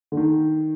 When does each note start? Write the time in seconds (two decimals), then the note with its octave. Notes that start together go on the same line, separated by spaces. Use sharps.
0.12 D3
0.17 D#3